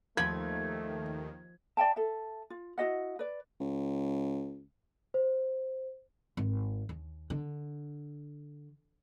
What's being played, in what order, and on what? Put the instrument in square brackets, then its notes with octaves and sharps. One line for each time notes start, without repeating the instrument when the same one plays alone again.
[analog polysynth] D#2 D#3 [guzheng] F3 B5 [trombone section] A3 [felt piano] G#6
[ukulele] D5 E5 G5 A5
A4 E5
F4
E4 F#4 D#5 F#5
B4 D5
[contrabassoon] C#2
[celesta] C5
[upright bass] G#1
D#2
D3